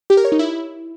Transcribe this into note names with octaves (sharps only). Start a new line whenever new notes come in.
G4
A#4
C#5
D#4
E4